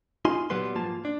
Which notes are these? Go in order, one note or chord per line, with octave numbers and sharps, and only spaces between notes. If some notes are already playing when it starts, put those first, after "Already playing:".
D#4 F4 G#5 C6
A#2 F#3 G3 B3 B4 C6
G#2 F3 A#3 F4 A5
D4